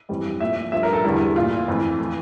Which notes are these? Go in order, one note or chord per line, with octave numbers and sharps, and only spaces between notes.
F2 E3 G3
A#2 F3 A3 E5
G2 F3 A3 E5
A#4
A4
E2 D3 G3 E4
A#2 A3 F4
F2 E3 A3
E3 A3